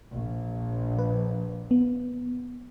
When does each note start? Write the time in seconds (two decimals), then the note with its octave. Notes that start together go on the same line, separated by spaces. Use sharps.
0.12 A#1
0.99 B4
1.71 B3